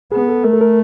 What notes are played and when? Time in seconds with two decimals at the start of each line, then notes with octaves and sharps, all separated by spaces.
0.12 B3 G#4
0.29 A4
0.44 A3 A#4
0.53 A4
0.61 A#4